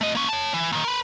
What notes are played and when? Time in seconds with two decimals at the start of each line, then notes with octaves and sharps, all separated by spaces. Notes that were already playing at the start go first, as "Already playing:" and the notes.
0.01 A3 D#5
0.15 A#3 C#4
0.29 C#5 A5
0.54 E3
0.73 A#2 D#3
0.84 A#4 B4